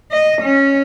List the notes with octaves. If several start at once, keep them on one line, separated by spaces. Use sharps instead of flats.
D#5
C#4